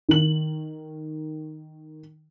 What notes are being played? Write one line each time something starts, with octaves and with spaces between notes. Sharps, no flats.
D#3 F#7